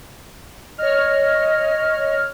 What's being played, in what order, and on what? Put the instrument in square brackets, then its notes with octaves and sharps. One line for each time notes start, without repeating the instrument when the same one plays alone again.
[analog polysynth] C#5 F6 [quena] D#5